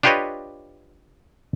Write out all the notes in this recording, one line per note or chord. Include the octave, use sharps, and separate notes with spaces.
D4 F4 G4 B4 C#5 D#5